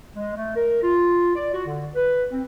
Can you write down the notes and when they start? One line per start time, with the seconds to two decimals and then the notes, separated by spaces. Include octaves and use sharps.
0.15 G#3
0.35 A3
0.56 A#4
0.83 F4
1.36 D5
1.54 F#4
1.66 D3
1.94 B4
2.31 C4